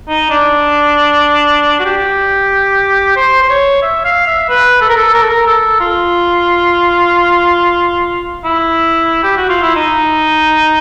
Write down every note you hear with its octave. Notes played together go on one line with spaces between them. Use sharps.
D#4
D4
F#4
G4
C5
C5
C#5
E5
F5
E5
B4
A4
A#4
A4
A#4
A4
A#4
A4
F4
E4
G4
F#4
F4
E4
D#4